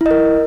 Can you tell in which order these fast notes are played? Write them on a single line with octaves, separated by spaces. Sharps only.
E4 D#5 A#4